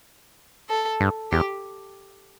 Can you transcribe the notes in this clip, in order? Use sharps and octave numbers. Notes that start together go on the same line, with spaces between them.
A4
G2
E2 G4